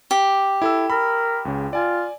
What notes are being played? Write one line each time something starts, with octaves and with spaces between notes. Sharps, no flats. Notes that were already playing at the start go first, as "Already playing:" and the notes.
G4
E4 A4 E6
A#4 B5
C#2 C#3
F4 D5 G#5